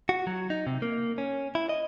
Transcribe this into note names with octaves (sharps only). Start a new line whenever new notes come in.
F#4
F#3
D#4
C3
A#3
C#4
E4
D#5